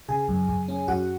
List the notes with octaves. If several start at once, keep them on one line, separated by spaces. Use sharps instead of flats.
C#3 G#4 G#5
F#2
F#2
C#4
F#2 F#4 F#5